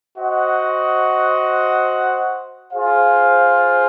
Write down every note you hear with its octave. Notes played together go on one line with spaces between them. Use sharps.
F#4 C5 D#5 F#5
F4 G#4 C5 F5